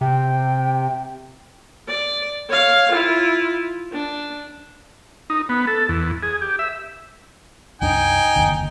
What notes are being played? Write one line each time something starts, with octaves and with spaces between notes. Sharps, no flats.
C3 G5
D5
C#5 F5
E4 F4
D4
D#4
B3
A4
E2
G#4
G4
E5
C2 F#2 D4 D#4 G5 G#5
F#1 D#2 D3